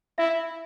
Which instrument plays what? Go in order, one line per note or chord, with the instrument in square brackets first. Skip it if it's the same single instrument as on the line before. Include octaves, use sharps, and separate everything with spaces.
[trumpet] E4 [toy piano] E5